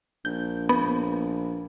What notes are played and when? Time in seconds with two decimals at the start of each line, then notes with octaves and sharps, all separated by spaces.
0.25 A#1 G6
0.69 B3